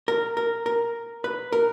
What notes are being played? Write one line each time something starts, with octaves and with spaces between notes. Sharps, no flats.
A#4
A#4
A#4
B4
A#4